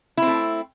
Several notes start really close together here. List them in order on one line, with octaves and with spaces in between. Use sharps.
E4 C4 A3